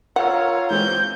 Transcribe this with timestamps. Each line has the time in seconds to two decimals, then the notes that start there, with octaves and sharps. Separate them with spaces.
0.16 F4 A#4 C#5 F#5 A#5 E6
0.70 E3 G#3 C4 G6